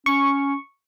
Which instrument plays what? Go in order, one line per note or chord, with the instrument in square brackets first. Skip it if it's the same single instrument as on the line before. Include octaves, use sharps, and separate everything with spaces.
[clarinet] C#4 [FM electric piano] C#6